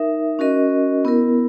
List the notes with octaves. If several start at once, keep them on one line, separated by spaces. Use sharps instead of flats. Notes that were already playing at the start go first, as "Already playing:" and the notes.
Already playing: D#4 A#4 E5
C#4 F#4 A#4 D#5
B3 E4 A#4